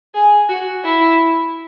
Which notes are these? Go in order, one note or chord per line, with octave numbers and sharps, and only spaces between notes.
G#4
F#4
E4